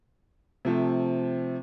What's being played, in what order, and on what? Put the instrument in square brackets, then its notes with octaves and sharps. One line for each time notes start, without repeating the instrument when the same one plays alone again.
[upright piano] C3 F3 A3